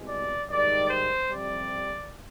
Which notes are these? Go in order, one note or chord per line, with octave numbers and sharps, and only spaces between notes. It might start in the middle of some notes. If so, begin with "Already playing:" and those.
Already playing: C2 B2 G#3
D5
G#2 D#3 G3 D5
C5
F2 C3 G3 D5